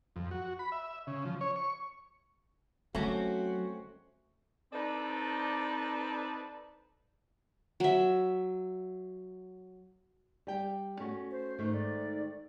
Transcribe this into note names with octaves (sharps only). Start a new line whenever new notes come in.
F2
F#4
B5
E5
C#3
F3
C#5
C#6
F#3 A3 C4 C#4 F#4
C4 D4 D#4 A4 B4 D5
F#3 E5
G3 G5
A3 C#4 F#4
C5
G#2 D#3 A3
D5